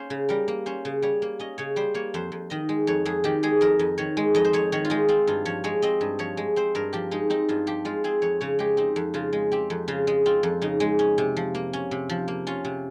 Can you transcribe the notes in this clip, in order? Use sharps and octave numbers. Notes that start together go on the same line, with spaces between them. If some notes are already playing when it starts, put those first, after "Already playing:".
Already playing: A#3 C#4 C5
C#3
G3 A#4
A#3
C#4 C5
C#3
G3 C#5
A#3
C#4 D#5
C#3 C#5
G3 C5
A#3 C#5
F2 C5
F2
D#3 D#5
G#3
F2 C#5
F2 G#4
D#3 G4
G#3 G#4
F2 A#4
F2
D#3 C#5
G#3
F2 D#5
C5
F2 C#5
D#3 C#5
F4
G#3 D#4
C4 F4
G2 F4
F3 C#5
G#3 C#5
C4 D#5
G2
F3 C#5
G#3
C4 C5
G2 A#4
F3 G4
G#3 D#4
C4 D#4
G2 F4
F3 G4
G#3 F4
C4 G#4
F2 C#5
C#3 C#5
G#3 G4
C4 D#4
F2
C#3 F4
G#3
C4 G4
F2
C#3 F4
G#3
C4 F4
F2
C#3 D#4
G#3
C#4
C3
F3
A#3
C#4
C3
F3
A#3
C#4 F4
C3